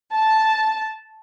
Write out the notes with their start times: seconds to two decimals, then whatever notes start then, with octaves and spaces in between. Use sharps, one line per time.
0.13 A5